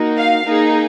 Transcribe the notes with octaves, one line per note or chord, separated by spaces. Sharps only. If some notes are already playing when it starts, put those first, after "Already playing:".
Already playing: A#3 D#4 F#4
F5
A#3 D#4 G#4